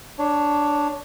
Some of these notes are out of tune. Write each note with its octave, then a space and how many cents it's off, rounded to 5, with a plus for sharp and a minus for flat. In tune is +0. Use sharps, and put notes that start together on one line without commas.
D4 +0 C#5 +15